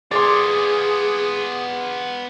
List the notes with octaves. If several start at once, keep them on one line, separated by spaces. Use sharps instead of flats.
B3 F4 G#4 D5 C6